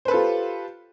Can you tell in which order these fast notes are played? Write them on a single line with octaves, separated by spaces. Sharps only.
C5 B4 A4 F4 G4